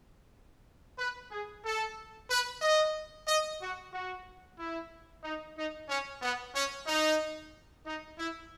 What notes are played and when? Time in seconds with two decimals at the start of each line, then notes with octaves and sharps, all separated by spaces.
0.98 B4
1.32 G#4
1.64 A4
2.30 B4
2.62 D#5
3.27 D#5
3.61 F#4
3.93 F#4
4.58 E4
5.23 D#4
5.56 D#4
5.89 C#4
6.22 B3
6.54 C#4
6.87 D#4
7.85 D#4
8.18 E4